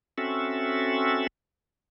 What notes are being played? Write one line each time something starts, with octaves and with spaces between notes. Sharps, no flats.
C4 C#4 F#4 A4 E5